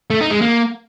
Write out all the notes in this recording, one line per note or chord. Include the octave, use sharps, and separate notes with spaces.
A3
D#4
G#3
A#3